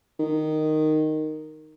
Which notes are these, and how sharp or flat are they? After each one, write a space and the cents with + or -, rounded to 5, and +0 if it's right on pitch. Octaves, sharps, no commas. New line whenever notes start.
D#3 -10